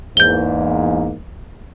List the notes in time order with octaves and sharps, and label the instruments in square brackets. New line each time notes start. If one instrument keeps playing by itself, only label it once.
[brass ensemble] E2 G#2 A#3 [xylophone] G6 G7